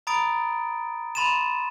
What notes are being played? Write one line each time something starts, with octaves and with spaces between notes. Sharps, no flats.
A#5 B5 D#6 A6 D7
B5 C6 A6 D#7 E7